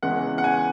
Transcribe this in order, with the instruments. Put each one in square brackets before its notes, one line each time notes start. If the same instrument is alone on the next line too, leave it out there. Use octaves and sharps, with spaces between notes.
[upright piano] E2 C#3 E3 G#3 F#5
F#5
G#5